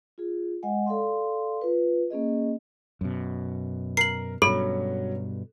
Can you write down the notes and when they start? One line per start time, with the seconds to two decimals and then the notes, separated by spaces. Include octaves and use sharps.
0.18 F4 G#4
0.63 G#3 D#5 F#5 G#5
0.86 A4 D5 F5 C6
1.61 F4 B4
2.10 A#3 C#4 G#4 D#5
3.01 F#2 B2
3.97 A#4 C7 F#7
4.42 G2 B2 F#3 C#4 A4 B5